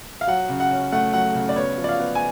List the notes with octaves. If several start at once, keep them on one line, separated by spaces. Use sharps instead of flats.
F5
F#3 F#5
C#3
F#5
C#4
A3 F#5
F#3 F#5
C#3
D5
B3 C#5
F3
D5
F5
B3
G#5